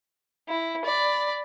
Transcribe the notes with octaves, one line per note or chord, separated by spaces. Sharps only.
E4
D5 B5